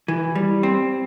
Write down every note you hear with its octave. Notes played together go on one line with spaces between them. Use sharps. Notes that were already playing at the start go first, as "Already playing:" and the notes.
E3
G3
C4